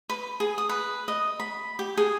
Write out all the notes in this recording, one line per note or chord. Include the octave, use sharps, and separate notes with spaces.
B4
G#4
D#6
B4
D#5
B5
G4
G#4